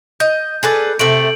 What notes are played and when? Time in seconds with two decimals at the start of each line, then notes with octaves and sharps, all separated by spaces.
0.20 D#5 G6
0.63 G#4 A4 B4 D5
0.99 C3 A3 A4 D7 F#7